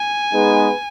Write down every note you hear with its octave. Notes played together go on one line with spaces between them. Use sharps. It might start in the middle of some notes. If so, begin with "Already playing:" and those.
Already playing: G#5
G#3 B3 D#4 G#4 B4